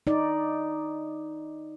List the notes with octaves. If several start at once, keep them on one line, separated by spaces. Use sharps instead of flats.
D#4 D5